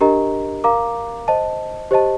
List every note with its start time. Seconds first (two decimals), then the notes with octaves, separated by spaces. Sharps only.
0.01 D4 G4 A#4 D#5 A#5
0.64 A#4 F5 A#5 D6
1.28 C5 D#5 A5
1.91 G4 C5 D#5 A5